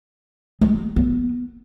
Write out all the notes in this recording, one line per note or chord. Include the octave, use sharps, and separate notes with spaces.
G#3
B3